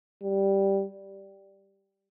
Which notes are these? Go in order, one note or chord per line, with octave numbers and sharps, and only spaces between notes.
G3